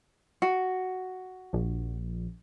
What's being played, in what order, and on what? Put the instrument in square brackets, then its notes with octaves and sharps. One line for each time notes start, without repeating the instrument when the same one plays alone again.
[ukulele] F#4
[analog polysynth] A#1